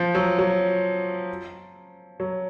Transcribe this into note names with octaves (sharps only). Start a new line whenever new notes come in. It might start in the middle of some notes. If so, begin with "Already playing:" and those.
Already playing: F3
F#3
F#3
F#3